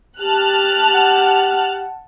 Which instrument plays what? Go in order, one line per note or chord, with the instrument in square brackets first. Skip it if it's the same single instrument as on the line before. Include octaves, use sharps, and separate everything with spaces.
[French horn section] G4 [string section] A5 F6 F#6
[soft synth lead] F#5